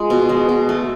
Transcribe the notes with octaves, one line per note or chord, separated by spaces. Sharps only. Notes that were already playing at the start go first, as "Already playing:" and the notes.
Already playing: G#3 F4
B2
G#3
B2
A3